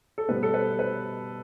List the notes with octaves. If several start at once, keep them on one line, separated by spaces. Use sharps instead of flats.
A4
B2 G3 B3 B4
A4
B4
B4